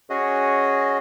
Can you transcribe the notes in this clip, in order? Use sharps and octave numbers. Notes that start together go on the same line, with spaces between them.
C#4 F#4 G#4 D#5